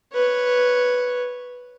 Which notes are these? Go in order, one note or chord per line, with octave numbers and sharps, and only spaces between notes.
B4 C#5